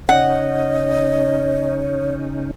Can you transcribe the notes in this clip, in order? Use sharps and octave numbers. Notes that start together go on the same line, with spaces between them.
C#3 C#4 D#4 C#5 D#5 F#5